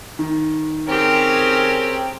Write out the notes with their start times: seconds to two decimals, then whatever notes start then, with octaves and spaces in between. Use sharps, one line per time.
0.19 D#3
0.88 C4 C#4 G4 G#4 A#4